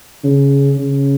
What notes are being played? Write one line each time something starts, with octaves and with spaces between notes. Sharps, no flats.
C#3
C#3